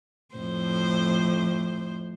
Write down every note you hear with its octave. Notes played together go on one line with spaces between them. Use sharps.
F2 A2 C5